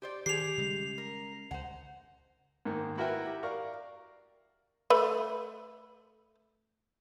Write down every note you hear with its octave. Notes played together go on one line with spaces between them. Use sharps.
G4 C5 D5
D#3 G4 G#4 C7 F7
C#3 G3 G#3
A#4
C#2 C5 F#5
G#2 D#3 A#3
E4 F#4 A#4 B4 E5 G5
G4
A#4 D5 F5 C#6
A3 B4